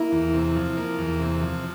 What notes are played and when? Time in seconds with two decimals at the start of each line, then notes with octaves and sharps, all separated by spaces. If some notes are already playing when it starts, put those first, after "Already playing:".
Already playing: A#3 E4
0.12 E2
0.34 C3
0.56 F3
0.77 A#3
0.99 E2
1.20 C3
1.41 F3